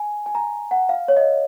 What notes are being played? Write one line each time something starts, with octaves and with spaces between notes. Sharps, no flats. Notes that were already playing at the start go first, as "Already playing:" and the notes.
Already playing: G#5
G#5
A#5
F#5
F5
C#5
D#5